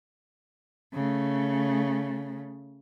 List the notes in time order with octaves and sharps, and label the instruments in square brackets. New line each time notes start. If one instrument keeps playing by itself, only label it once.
[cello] C#3 A3